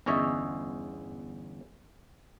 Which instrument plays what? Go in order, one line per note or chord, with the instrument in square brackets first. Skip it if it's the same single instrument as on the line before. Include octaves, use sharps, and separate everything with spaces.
[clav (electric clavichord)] G1 E2 C#4 C#5 D#5 E5